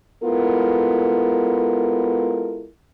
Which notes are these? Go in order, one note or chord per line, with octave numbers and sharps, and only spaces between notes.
G#3 B3 E4 F4 A4 A#4